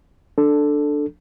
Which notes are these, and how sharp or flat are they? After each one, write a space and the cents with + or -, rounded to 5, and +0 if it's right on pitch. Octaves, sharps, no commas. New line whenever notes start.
D4 +5 A4 +0